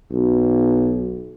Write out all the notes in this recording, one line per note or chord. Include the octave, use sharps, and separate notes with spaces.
B1